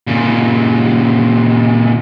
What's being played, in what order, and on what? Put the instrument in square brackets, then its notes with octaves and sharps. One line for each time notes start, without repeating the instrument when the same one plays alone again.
[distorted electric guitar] A#2 C#3